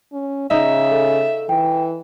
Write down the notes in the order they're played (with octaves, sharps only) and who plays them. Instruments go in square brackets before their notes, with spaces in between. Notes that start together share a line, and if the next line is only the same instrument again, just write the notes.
[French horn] C#4
[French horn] C#3 [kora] D#4 [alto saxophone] E5
[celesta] A4
[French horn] E3 [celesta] G5